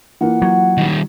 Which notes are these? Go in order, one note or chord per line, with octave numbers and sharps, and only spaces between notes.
E3 A#3 F4 F#5
F#3
D#3 G3